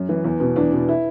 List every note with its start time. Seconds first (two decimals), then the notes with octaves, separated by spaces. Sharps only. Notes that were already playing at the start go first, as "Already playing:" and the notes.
Already playing: F#2
0.09 E3
0.24 E2
0.40 B2
0.56 E2 D4
0.72 B2
0.89 E4